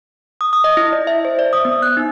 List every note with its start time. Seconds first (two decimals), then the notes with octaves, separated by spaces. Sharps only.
0.41 D#6
0.53 D#6
0.64 D#5
0.77 E4
0.93 D5
1.07 E5
1.25 C5
1.39 D5
1.53 D#6
1.65 B3
1.82 F#6
1.97 D#4